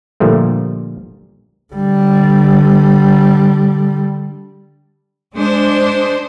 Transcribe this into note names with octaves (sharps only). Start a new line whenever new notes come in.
A#2 D3 F3 G3 A3
D3 G3
G#3 D4 C5